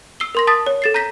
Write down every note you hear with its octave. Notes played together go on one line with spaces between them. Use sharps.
E6 C7 G7
A#4 C6 A#6
A5 D#6 A6 B6
C#5
A4 A6 C7
A#5 G6 A#6 B6